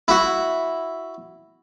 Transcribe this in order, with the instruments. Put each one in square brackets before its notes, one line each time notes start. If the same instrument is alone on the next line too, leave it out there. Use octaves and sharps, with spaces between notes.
[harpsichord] E4 F#4